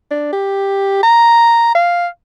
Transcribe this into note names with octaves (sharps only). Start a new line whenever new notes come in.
D4
G4
A#5
F5